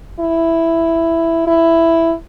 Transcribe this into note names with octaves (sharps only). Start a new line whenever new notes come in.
E4
E4